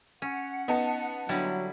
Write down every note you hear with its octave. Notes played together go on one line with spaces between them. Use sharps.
C#4 F#5
B3 D#4 A5
D3 F#3 G3 E4